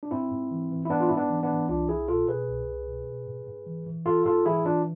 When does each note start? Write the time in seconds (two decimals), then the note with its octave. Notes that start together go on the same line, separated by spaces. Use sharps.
0.03 D4
0.11 G#2 C4 E4
0.31 G#2
0.51 E3
0.71 E3
0.85 E4
0.90 G#2 B3 D4
1.00 F4
1.09 G#2 E4
1.16 B3 D4
1.30 E3
1.43 B3 D4
1.50 E3
1.69 C2 D4 F4
1.89 C2 E4 G#4
2.08 B2 F4 A4
2.28 B2 G#4 B4
2.48 C2
2.68 C2
2.88 B2
3.07 B2
3.27 G#2
3.47 G#2
3.67 E3
3.87 E3
4.06 G#2 F4 A4
4.25 G#2 F4 A4
4.46 E3 E4 G#4
4.65 E3 D4 F4